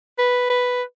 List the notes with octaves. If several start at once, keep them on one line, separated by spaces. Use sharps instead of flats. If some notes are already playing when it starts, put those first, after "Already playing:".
B4
B4